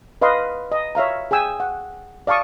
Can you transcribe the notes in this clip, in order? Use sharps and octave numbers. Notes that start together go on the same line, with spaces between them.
B4 D#5 F5 B5 C6
D#5
C#5 E5 F5 A#5
G#4 G5 G#5 E6
F#5
D5 F5 A5 C#6 D#6